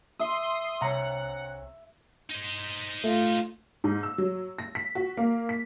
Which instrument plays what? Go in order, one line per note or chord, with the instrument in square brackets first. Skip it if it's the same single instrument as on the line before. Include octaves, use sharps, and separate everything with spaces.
[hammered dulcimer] E5 [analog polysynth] C6 D#6
[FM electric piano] C2 [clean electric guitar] C3 C#5 A#5 [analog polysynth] F#5
[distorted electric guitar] D#4 C5
[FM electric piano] A3 [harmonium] F4
[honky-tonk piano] G#2
E6
F#3
A#6
B6
F#4
A#3
B6